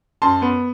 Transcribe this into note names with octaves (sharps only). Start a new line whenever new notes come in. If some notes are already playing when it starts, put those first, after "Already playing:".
F#2 A5 C6
B3